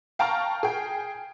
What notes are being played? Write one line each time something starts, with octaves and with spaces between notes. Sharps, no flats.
F5 G5 A5 A#5 C#6 F6
G#4 G5